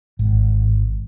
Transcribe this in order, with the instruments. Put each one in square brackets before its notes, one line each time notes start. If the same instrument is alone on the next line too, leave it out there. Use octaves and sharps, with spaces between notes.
[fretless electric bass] G#1